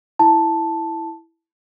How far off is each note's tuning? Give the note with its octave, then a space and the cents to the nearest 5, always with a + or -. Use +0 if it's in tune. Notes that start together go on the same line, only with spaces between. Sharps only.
E4 +0 A5 +0